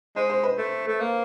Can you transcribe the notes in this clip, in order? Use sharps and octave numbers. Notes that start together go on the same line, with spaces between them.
G#3 C5
C5
B4
A3
A3
A#3